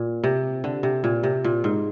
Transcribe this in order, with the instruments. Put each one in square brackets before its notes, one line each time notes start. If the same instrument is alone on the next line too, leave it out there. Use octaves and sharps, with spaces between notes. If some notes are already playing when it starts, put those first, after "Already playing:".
Already playing: [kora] A#2
C3
D3
C3
A#2
C3
A#2
G#2